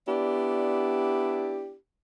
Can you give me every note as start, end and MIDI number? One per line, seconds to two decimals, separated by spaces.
0.07 1.74 59
0.07 1.74 62
0.07 1.74 64
0.07 1.74 67
0.07 1.74 74